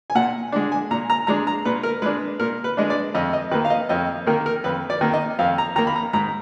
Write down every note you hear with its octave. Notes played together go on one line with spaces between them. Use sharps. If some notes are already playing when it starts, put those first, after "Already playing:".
G#5
A#2 F#5
G#3 D4
G#5
A#2 A#5
A#5
G#3 D4 A#5
A#5
A#2 B4
A#4
G#3 D4 B4
A#2 A#4
B4
G#3 D4 D#5
D5
F2 D#5
D#5
D#3 A#3 B4
F5
D#5
F2 D#5
D#3 A#3 A#4
A#4
F2 B4
D5
D#3 A#3
D#5
F2 F5
A#5
D#3 A#3 A#5
B5
A#5
G#2 A#5